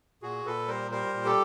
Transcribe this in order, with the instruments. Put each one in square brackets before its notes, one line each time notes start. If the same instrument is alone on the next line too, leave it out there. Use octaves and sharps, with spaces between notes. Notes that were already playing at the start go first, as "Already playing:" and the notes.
[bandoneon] A#2 F#4 G#4
A#2 A4 B4
G3 A#4 C5
G3 A#4 C5
A#2
G4 A4